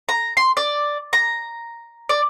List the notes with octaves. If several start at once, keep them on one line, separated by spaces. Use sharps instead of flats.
A#5
C6
D5
A#5
D5